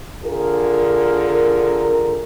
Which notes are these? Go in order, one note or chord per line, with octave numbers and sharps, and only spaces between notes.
D3 F4 G#4 A#4